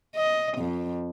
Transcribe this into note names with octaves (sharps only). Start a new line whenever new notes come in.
D#5
F2